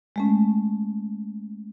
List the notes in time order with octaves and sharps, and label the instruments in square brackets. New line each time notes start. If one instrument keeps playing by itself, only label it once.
[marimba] G#3 A3 C#4